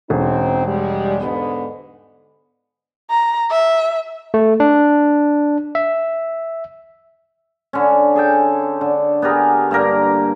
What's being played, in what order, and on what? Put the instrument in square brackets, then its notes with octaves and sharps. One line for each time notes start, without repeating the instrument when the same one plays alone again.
[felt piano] E1 [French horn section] C4 C#4 D#4
[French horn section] G3 G#3
G#2 D3 B3
[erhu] A#5
E5
[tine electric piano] A3
D4
E5
[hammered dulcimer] D3 C#4
G#4 A4 G5
D3
B3 G4 G#4 A#4
G2 A#3 A#4